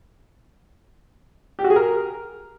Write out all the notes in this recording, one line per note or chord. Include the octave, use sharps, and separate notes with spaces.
G4
F#4
G#4
A#4